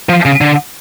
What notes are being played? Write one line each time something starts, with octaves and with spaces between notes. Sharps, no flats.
F3
C#3
D3